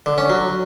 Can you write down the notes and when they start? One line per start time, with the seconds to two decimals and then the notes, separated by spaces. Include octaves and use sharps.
0.06 D3
0.18 C#4
0.30 F#3